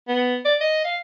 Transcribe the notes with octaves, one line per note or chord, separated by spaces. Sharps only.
B3
D5
D#5
F5